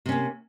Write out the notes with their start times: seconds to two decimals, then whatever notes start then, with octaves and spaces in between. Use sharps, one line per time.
0.06 C3
0.09 C#4
0.12 A#3